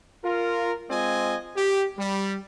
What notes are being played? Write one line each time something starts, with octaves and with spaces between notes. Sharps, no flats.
F4 A#4
G#3 C4 F4 D#5 G#5
G4
G3